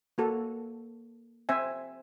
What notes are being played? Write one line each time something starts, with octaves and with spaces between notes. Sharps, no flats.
A#3 F#4 A4
C4 C5 E5 G#5